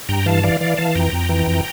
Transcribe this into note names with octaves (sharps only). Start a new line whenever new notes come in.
G2 G5 A#5
E3 F5 A5
E3 D5 F5
E3 D5 F5
E3 F5 A5
F2 G5 A#5
F2
E3
F2